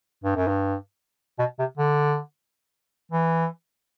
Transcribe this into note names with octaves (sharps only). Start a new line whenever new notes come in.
G2
F#2
G2
B2
C3
D3
E3